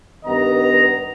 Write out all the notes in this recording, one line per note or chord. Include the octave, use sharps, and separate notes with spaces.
G2 D#3 B3 D#5 A#5